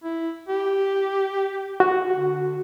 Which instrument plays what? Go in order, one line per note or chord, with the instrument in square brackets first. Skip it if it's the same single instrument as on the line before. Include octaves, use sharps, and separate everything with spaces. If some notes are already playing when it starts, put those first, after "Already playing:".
[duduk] E4
G4
[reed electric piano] F#4
[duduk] D3